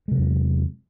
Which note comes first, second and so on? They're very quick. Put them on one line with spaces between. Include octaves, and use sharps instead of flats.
G#3 C3 F#3 E2